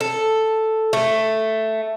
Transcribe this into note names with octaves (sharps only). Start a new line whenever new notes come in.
A4
A3